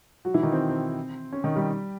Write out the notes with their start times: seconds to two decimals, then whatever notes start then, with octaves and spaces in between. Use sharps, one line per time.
0.25 F#3 F#4
0.34 E3 E4
0.43 D#3 D#4
0.52 C4
0.69 C4
1.33 C#4
1.44 D#3 D#4
1.56 G3 G4